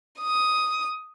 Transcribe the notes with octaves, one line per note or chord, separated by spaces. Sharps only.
D#6